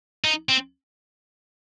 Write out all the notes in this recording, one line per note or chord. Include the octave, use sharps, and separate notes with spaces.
D#4
C4